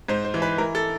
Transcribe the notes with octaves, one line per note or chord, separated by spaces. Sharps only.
G#2 C5
C5
E3
B4
E3 A#4
A4